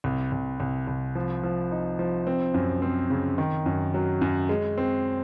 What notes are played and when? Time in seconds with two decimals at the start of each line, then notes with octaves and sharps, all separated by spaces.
0.04 C2
0.32 C2
0.60 C2
0.87 C2
1.15 F3
1.43 F3
1.72 D#4
1.99 F3
2.27 C4
2.54 F#2
2.82 C4
3.10 C#3
3.38 D#3
3.66 F#2
3.94 F#3
4.21 F#2
4.49 G#3
4.78 C4